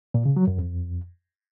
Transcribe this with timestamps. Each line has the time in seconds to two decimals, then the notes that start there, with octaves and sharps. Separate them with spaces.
0.14 A#2
0.25 C#3
0.36 F#3
0.47 F#2
0.58 F2